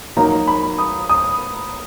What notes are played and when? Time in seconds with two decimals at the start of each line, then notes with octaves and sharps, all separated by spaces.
0.17 F#3 A#3 D#4 A#5
0.47 B5
0.78 D#6
1.09 D#6